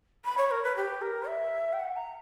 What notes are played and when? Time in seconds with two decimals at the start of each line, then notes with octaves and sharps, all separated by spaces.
0.25 B5
0.38 C#5
0.51 A#4
0.63 B4
0.76 G4
1.02 A#4
1.28 E5
1.73 G5
1.79 F#5
1.96 A#5